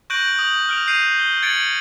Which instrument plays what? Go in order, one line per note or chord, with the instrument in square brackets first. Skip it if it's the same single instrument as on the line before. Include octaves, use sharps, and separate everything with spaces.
[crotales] C#6 F#6 G6 A#6 D7 F#7
D#6 F#7
F6 D7 F7
G6 C7 D#7 F7
G7
G#6 A6 C#7 D7 F#7